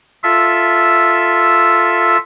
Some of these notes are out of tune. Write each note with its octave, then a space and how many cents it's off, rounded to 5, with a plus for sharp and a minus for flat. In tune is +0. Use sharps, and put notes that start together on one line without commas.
F4 +0 A4 +0 E5 +0